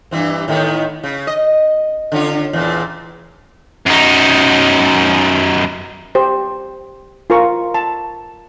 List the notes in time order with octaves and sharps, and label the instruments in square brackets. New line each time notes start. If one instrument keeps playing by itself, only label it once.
[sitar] G2 E3 C4
A2 D#3 B3
C#3
D#5
D3 C#4 F4
E2 A#2
[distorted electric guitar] F#2 D#4
[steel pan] G4 C5
F4 A#4 C#6
A5